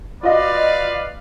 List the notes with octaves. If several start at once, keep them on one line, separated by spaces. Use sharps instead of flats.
F4 F#4 B4 D5 D#5 F5